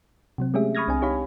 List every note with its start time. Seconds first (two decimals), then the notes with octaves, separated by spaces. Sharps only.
0.38 C3 F#3 C4
0.54 G#3 A3 C#4 G4 G#4 E5
0.75 B5 C#6 D#6 F6 G#6 A#6
0.88 C2 C4 D4 G#5
1.01 D#4 G4 C#5 F5 B5